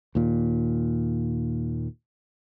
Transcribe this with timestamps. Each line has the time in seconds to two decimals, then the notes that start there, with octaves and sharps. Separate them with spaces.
0.15 D#2 A#2